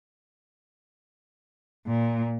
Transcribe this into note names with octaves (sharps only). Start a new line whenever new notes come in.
A#2